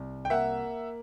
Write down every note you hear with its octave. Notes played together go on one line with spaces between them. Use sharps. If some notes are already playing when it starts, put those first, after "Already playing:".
Already playing: C2
G5
A#3 E5 F#5